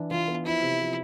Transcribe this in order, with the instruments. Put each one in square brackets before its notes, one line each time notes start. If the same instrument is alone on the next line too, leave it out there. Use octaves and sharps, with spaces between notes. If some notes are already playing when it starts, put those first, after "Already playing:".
Already playing: [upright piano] E3 D4
[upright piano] E3 [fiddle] F4
[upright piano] B3
[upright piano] F3 [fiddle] E4
[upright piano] C3
F3